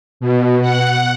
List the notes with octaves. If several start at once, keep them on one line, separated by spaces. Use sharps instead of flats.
B2
F#5